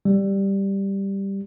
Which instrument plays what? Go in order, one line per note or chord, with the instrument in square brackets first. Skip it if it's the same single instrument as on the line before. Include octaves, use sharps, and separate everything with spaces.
[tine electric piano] G3